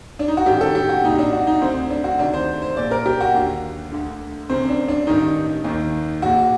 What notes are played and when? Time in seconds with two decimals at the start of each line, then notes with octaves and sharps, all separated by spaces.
0.19 D4
0.28 D#4
0.37 F#4
0.46 A1 G2 D#3 G4
0.61 A4
0.75 G4
0.89 F#4
1.04 C2 A#2 D#4
1.18 D4
1.33 F#4
1.47 D#4
1.61 D2 D3 C4
1.90 D4
2.04 F#4
2.19 D2 C3 D#3 D4
2.34 C5
2.62 C5
2.77 A#1 A#2 D5
2.91 A#4
3.06 G4
3.21 F#4
3.34 D#2 D3
3.92 D2 D3
4.49 F#1 F#2 D3 C4
4.69 D4
4.88 D4
5.07 A1 G2 D#3 D#4
5.64 D#2 D#3
6.22 A#1 A#2 F#4